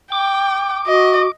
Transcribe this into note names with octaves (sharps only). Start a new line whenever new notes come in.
G5 D6
F#4 D#5